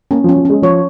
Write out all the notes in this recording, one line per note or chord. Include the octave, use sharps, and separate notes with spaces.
A#3 C#4
F3
C#4
F3
G#3 C#4
F3 C#5